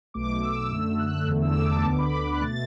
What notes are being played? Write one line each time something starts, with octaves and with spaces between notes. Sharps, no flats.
B1 B2 A3 D6
D6
E6
F#2 D3 A3
F#6
E2 D3 A3
E6
D6
A5
D2 D3 B3 D6
B5
D6
F#6
B2 A3 A6